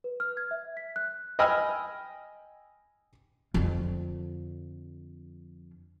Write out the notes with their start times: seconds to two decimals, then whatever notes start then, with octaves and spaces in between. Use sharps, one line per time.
0.04 B4
0.20 F6
0.37 G#6
0.51 E5
0.77 B6
0.96 F#6
1.39 D#5 G5 G#5 B5 E6 F6
3.54 F2 D3